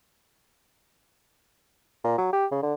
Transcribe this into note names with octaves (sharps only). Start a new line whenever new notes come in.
A#2
F#3
G4
C#3
D3